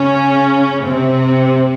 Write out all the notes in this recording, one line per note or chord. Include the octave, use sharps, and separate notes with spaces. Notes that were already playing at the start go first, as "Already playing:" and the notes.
Already playing: C#3 C#4
C3 C4